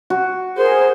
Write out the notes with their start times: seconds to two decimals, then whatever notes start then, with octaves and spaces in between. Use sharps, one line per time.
0.10 F#4
0.57 G#4 A#4 C5